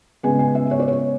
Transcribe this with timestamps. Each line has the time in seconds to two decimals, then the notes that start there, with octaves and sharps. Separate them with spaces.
0.23 C#3 G#3 B3 G#5
0.39 G#5
0.55 E5
0.71 C#5
0.79 D5
0.88 C#5